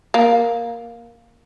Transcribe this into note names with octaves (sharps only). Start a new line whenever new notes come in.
A#3